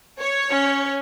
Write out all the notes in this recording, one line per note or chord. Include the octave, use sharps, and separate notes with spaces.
C#5
C#4